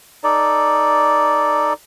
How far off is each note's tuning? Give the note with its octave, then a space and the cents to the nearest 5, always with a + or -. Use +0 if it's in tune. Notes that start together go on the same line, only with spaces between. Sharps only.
D#4 +0 A4 +0 D5 -5